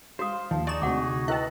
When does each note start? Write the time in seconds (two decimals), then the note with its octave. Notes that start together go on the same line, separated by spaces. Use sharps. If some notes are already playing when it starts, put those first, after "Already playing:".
0.19 F#4 C5 F5 D#6
0.51 D#2 F3
0.67 D#4 G#4 D5 C#6 E7
0.82 D2 C3 F#4 F#5 D6
1.28 E4 A#4 B4 D#5 G5 A5 F#6